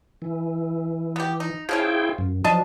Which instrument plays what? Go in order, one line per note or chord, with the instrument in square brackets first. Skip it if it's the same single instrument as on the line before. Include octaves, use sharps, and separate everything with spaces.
[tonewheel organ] E3
[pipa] B3 G4
D#4
[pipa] F3 C#4 F4 [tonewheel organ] E4 G#4 G5
[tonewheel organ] F#2
[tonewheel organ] F3 F#3 [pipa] D4 D#5 A5